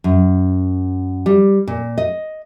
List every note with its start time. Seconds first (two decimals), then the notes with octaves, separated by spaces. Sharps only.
0.04 F#2
1.26 G3
1.67 A#2
1.98 D#5